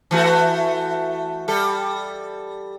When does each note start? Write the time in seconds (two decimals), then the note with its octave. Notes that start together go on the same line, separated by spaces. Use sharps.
0.11 E3 A3 F#4
1.48 G3 A4